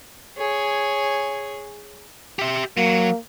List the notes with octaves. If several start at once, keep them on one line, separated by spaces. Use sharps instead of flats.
G#4 C#5
G4 E5
F#3 A#3